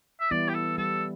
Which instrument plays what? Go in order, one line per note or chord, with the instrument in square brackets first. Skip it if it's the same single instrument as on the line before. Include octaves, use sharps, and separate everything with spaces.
[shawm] E5
[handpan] E3 G3 B3 E4 [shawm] D5
[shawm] G4
A4
[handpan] G3 [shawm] A4